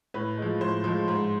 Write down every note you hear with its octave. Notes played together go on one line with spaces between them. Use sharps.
A2 B4
F3 G#3
A2 C5
F3 G#3
G#2 C5